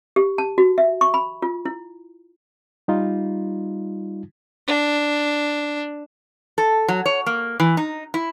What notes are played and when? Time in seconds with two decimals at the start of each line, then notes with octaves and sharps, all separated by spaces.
0.16 G4
0.38 A5
0.58 F#4
0.78 E5
1.01 C#6
1.14 B5
1.42 F4
1.65 E4
2.88 G3 D#4 F4
4.67 D4
6.58 A4
6.88 F#3
7.06 C#5
7.26 A#3
7.60 E3
7.77 D#4
8.14 E4